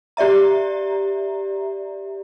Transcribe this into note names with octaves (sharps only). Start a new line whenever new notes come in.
G4 D5 E5 A#5